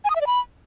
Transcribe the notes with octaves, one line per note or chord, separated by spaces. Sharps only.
G#5
D#6
E5
D5
B5